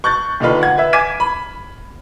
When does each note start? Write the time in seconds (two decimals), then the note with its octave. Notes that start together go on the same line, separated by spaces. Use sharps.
0.04 C#6 F#6 G6 A6
0.40 D#2 D3 D#4 F4 B4
0.61 F#5 G#6
0.78 B4 E5
0.93 G#5 D6 G#6 B6 D#7 E7
1.20 B5